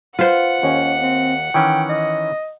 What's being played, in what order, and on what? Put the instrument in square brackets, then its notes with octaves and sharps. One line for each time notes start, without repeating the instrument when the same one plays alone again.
[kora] F4 C5 [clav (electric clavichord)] B4 [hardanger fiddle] F#5
[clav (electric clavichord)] D#2 [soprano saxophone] C#4
[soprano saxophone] C4
[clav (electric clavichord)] D#3 E3 C#4 [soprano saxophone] G5
[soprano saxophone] D#5